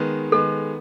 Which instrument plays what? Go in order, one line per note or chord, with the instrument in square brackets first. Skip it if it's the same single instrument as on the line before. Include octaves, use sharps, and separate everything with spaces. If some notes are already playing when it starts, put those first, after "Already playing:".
Already playing: [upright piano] D#3 G#3 B3
[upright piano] D#3 G#3 B3 [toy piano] A4